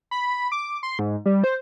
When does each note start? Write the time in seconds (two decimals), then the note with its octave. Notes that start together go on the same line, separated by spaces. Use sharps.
0.11 B5
0.52 D6
0.83 C6
0.99 G#2
1.26 G3
1.44 C5